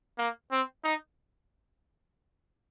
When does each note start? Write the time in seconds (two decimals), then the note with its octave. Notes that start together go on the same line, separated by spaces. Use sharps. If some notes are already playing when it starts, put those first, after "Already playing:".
0.18 A#3
0.52 C4
0.84 D#4